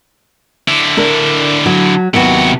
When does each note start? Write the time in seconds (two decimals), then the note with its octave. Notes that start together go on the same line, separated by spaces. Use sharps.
0.68 D3 E4
0.97 D4 A#4
1.66 F#3
2.14 D#2 C3 F#3 B3 F#4